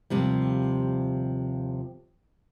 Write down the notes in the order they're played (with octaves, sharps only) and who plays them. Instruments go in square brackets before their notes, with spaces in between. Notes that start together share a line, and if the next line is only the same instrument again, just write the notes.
[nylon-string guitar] D#2 C3 F3 G3